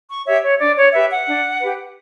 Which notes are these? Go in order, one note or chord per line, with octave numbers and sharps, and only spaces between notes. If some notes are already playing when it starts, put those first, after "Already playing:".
C#6
G4 C#5 E5
C#5
D4 D5
C#5
G4 B4 E5
F#5
D4
G4 B4